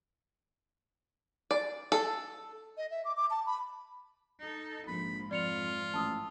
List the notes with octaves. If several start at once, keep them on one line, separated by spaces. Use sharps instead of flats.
D5
A4
D#5
E5
D6
D6
A5
B5
D#4 A4
A#1 G#2 F3 B5
F2 F4 D5 C#7 F7
A1 A5 D#6 E6